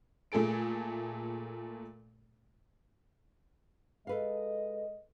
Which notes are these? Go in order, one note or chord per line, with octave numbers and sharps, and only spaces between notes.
A#2 A3 G#4 A4 D7
G#3 A4 B4 D#5 F5